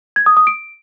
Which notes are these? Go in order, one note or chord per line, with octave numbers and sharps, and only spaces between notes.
G#6
D#6
D#6
D7